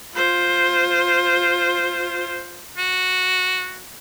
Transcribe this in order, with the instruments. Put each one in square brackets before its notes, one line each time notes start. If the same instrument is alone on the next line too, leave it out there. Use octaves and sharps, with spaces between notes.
[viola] F4 C5
[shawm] F#4